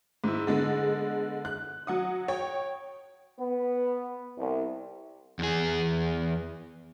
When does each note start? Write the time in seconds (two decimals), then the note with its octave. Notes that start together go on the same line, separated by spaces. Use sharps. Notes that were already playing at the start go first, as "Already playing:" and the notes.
0.24 G#2 E4
0.47 D3 G#3 B3
1.45 F#6
1.87 F#3 F#5 D#6
2.28 C#5 G5
3.39 B3
4.37 C2
5.39 E2 G#4